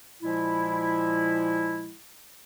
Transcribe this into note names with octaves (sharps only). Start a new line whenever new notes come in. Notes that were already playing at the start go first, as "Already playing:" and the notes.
A#2 F3 G#3 E4